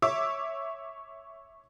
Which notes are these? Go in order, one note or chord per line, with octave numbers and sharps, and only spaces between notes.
C#5 E5 D6 E6